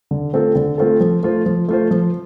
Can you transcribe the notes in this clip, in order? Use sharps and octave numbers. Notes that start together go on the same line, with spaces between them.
D3
A3 C4 F4 A4
D3
A3 C4 F4 A4
F3
A3 F4 C5
F3
A3 F4 C5
F3